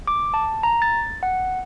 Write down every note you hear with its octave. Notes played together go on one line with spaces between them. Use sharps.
D6
A5
A#5
A6
F#5